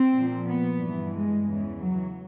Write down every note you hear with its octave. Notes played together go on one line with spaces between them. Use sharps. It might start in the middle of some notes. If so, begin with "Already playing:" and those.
Already playing: C4
A#2 F3
B3
G2 E3
G#3
E2 C#3 E3
F#3